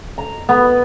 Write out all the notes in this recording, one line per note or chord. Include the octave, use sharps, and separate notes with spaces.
A#5
B3